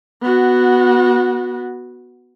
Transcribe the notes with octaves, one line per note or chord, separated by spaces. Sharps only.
B3 F#4